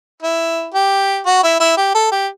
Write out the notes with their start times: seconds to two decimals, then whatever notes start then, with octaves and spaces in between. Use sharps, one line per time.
0.22 E4
0.74 G4
1.26 F#4
1.43 E4
1.60 E4
1.77 G4
1.95 A4
2.11 G4